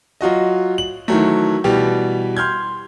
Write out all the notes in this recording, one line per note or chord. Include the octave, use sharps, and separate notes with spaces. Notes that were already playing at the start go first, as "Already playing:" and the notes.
F#3 F4 F#4 D#5
F#7
D#3 E3 F#3 A3
B2 E3 G3 G4
C6 F6 G6 G#6